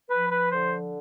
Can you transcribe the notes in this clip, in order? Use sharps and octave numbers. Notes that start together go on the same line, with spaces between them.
F3 B4
B4
D3 C5